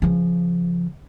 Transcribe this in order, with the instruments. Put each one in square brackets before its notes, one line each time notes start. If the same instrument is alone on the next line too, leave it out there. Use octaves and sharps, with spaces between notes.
[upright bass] C#3 F3